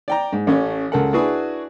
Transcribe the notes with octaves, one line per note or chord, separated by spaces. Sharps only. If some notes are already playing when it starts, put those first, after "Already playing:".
D5 G5 A#5
G#2
A1 A3 C#4
C#2 A4 A#4 F#5
D4 E4 F#4 G#4 B4 G#5